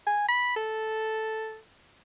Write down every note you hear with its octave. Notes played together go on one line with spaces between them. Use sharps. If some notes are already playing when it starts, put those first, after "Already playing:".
G#5
B5
A4